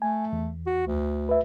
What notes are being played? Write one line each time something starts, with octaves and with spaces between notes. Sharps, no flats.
A3 G#5
E2
F#4
D2
B4 E5